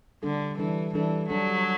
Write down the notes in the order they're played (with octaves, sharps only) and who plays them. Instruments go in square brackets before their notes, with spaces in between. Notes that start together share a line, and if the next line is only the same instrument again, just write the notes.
[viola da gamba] D3 [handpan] G3 D4 A4
[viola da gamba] E3 [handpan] G3 D4 A4
[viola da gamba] E3 [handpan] G3 D4 A4
[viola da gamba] F#3 [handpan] G3 D4 A4